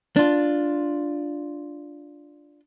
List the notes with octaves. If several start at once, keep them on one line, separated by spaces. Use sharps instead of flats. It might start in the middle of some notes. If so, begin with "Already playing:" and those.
D4 F4